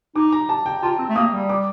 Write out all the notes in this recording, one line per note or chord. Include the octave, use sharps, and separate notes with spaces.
D#4 D6
A#5
A5
G5
F4 A5
C4
A3
A#3 D#6
G3
D6